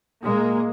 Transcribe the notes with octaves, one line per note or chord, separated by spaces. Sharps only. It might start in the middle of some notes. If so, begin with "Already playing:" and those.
A#2 G#3 A#3